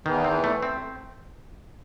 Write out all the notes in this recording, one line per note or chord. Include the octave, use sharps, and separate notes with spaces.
E2 D#3 E3
C4
A3
C4